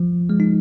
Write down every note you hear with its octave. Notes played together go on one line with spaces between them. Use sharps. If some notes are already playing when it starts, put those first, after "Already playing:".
Already playing: F3
G#3
D#4